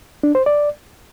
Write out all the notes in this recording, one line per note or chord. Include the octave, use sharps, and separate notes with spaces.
D4
C5
D5